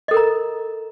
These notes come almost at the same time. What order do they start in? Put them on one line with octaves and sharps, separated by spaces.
D#5 A4 A#4 A#5